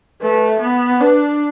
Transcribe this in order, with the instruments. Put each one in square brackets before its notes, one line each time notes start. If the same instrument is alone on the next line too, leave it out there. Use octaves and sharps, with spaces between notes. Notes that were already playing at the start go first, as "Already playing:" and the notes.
[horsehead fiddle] A3 [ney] B4
[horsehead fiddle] B3
[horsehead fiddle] D4 [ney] B4